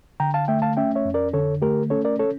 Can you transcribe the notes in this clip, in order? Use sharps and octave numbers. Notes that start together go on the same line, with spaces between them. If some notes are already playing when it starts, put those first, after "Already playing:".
D3 G5 A#5
F5 A5
A3 E5 G5
F5 A5
C#4 E5 G5
C#5 E5
F2
A#4 D5
D3 A4 C#5
A3 G4 A#4
C#4 A4 C#5
A#4 D5
A4 C#5